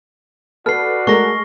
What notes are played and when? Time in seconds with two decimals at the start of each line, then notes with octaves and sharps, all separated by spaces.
0.66 F#4 A4 B4 D5 F6 C7
1.07 G#3 A3 A#4 C#6 A#6